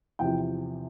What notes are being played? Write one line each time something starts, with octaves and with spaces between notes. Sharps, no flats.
E2 C3 F3 G5